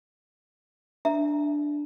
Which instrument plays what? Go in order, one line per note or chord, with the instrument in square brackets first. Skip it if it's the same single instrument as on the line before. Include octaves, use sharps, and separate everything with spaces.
[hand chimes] D4 [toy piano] E5 A#5